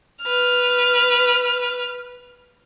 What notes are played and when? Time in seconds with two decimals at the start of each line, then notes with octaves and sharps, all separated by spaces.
0.23 B4 F6